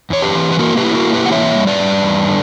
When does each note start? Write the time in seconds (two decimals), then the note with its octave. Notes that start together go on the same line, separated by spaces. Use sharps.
0.10 E2 C#5
0.22 G4 B4
0.35 E3
0.51 B4
0.59 A#3 F#4 A#4
0.77 G4 B4
0.83 E4
0.95 F#4 A#4
1.07 A#3
1.13 G4 B4
1.26 F#5
1.31 E3 C#5 E5
1.55 G3
1.67 B4 D5
1.79 G3
2.03 E2
2.27 D3